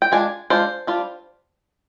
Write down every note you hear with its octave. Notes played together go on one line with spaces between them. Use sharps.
G5
G#3 D4 F4 G#5
G#3 D4 F4 C5
G3 D4 F4